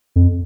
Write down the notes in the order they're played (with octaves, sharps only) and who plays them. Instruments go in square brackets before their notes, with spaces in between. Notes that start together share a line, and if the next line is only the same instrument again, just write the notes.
[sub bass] F2